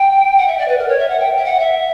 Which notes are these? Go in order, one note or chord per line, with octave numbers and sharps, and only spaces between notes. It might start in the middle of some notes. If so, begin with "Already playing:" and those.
Already playing: G5
F#5
E5
D5
B4
A#4
C#5
E5
F#5
G5
E5
F#5
E5